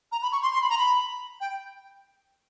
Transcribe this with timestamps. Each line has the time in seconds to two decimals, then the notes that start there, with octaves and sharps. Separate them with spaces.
0.12 A#5
0.22 B5
0.32 C#6
0.42 C6
0.53 C6
0.62 B5
0.70 A#5
0.78 B5
1.41 G5